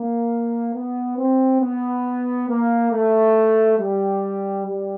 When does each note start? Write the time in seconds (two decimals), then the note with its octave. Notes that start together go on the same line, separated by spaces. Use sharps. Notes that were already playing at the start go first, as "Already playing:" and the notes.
Already playing: A#3
0.75 B3
1.18 C4
1.61 B3
2.49 A#3
2.92 A3
3.79 G3
4.67 G3